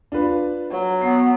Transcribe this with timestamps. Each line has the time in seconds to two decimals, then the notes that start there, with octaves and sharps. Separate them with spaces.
0.12 D4 F4 B4
0.71 F#3
1.01 B3 C7